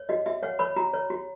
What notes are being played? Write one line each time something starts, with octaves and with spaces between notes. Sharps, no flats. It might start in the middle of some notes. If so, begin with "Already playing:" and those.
Already playing: C#5
F#4 D#5
F#4 E5
C#5 F#5
C#5 B5
F#4 A#5
C#5
F#4